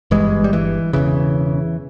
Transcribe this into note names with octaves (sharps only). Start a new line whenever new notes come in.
G1 G2 E3 G#3
G3
E3
E1 D#2 C#3 E3